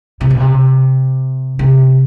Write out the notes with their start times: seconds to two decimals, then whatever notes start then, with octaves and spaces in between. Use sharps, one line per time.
0.21 C3
0.30 B2
0.40 C3
1.59 C3